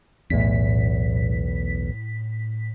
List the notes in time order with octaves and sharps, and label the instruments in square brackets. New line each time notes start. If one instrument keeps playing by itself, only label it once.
[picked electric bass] B1 E2 [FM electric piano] A2 B6